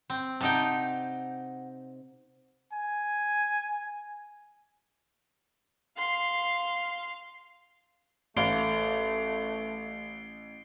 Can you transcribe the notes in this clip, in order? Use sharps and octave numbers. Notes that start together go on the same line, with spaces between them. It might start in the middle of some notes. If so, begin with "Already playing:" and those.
C4
C3 D#4 F#5 G5 A5
G#5
F5 C6
A1 A3 F5 C7 D7 G7